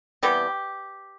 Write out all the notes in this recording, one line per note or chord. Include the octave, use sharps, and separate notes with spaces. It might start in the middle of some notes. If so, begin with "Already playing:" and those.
C3 E3 G3 B3 G4